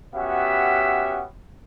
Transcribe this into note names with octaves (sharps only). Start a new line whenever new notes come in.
B3 C#4 F#4 G4 E5